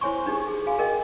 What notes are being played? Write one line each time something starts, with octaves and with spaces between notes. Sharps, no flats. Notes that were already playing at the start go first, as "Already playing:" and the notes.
E4 C5 C#5 G#5 C6 C#6
D4 D#4 G4 G#4
G#4
F#4 G#4 F5 G#5
G#4 A#4 D#5 G5